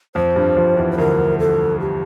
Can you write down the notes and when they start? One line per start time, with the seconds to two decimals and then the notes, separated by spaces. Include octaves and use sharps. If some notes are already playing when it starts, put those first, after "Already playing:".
0.15 F2 F3 C5
0.36 G2 G3
0.56 F2 F3
0.77 E2 E3
0.91 C5
0.98 D2 D3 A#4
1.39 A4
1.80 G4